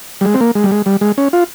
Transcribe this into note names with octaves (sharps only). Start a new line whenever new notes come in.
G3
G#3
C4
A#3
G#3
G3
G#3
G3
G#3
C#4
F4